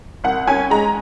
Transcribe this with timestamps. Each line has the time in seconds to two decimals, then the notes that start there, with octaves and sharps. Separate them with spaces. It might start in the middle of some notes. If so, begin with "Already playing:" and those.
0.24 C2 F#5
0.47 C#4 G#5
0.70 G#3 A#5